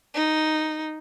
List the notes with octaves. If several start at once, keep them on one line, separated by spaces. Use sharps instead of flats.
D#4